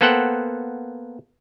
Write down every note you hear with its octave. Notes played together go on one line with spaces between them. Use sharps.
A#3 B3 A4 C5 F#5 G5